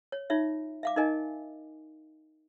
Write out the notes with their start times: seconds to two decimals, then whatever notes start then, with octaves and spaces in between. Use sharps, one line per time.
0.12 C#5
0.30 D#4 F4 C#5 E5
0.83 E5 F5 D6
0.96 D#4 A#4 D#5 G#5